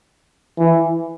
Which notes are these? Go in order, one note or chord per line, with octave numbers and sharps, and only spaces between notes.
E3